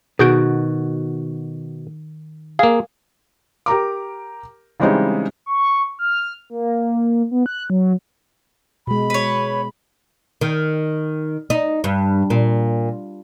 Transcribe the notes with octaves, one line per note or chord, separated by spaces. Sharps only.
B2 D#3 F#4 G#4 G6 D7
A#3 G#4 F5
G4 A#4 A#5 D6
C#3 E3 G3 G#3 C4 D#4
C#6
F6
A#3
B3
F#6
F#3
B2 G#3 B5
B4 C#5
D#3
D#4
G2
A#2